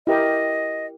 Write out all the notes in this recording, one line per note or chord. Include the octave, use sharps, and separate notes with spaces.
E4 G4 A#4 D#5